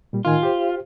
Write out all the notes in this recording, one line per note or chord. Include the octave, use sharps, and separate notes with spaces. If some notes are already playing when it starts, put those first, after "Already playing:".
A#2 G3
A2 D#3 F4 G#5
G4 C5